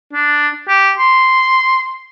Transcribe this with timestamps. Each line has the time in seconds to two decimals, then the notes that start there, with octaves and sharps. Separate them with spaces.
0.13 D4
0.69 G4
0.99 C6